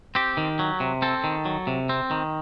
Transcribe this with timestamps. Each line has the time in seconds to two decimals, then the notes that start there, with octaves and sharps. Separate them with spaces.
0.15 C4 G4
0.37 D#3
0.59 F#3
0.80 C3
1.02 C4 A4
1.24 D#3
1.45 F#3
1.67 C3
1.89 C4
2.11 D#3